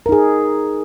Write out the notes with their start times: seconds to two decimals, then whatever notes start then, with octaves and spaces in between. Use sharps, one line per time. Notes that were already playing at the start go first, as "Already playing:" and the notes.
0.06 A#4
0.09 D#4
0.12 G#4